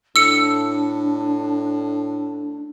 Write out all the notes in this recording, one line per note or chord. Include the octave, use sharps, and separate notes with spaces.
A2 D4 E6 C#7